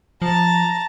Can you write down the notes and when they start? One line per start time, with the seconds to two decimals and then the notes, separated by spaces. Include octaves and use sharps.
0.22 F3 A5 A#5